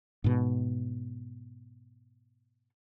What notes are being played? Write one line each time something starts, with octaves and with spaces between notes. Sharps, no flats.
G#2 B2